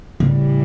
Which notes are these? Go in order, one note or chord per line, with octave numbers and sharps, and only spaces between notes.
A2 C#3 E3 G3